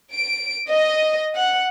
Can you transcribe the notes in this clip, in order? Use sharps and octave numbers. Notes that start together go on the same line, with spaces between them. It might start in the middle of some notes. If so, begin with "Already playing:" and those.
D7
D#5
F#5